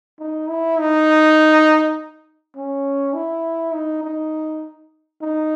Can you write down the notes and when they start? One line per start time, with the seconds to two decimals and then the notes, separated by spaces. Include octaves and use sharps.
0.20 D#4
0.49 E4
0.79 D#4
2.56 C#4
3.14 E4
3.74 D#4
4.03 D#4
5.22 D#4